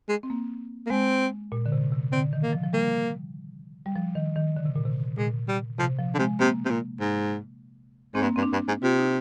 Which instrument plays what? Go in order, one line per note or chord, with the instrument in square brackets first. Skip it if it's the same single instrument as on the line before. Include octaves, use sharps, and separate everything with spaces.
[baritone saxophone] G#3
[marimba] C4
A#3
[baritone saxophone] A#3
[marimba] G#3 [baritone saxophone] C4
[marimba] A#2
D3
C3
C3
[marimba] D3 [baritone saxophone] C4
[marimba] D#3
[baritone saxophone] A#3
[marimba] F3
F3
[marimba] G3 [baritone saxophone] A#3
[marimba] G3
F3
D#3
D#3
D3
C3
A#2
C3
[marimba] A#2 [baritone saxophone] G#3
[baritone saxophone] G3
[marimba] C3 [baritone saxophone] F3
[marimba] F3
[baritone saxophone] D3
[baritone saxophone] C3 [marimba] G#3
[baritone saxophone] C3 [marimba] A#3
[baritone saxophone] C3
A#2
G#2
[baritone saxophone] G#2 [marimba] C4
[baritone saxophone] G2 [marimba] A#3
[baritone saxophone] G2 [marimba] C4
[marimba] D4
[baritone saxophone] G2
G#2
[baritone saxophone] C3 [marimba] F4
[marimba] D#4